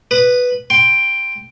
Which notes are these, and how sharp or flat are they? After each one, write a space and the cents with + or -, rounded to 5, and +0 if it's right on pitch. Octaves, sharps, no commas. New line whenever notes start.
B4 +0 D#6 -30
G5 +5 C6 +0